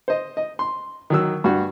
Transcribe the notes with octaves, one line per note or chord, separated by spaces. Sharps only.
C5 D#5
D#5
C6
D#3 F#3 E6
G2 F#4